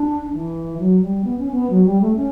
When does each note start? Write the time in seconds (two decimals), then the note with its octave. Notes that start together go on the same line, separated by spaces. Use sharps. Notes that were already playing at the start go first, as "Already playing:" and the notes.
Already playing: D4
0.33 E3
0.79 F#3
1.01 G3
1.24 B3
1.39 C#4
1.52 B3
1.70 F#3
1.85 G3
2.01 A3
2.16 C#4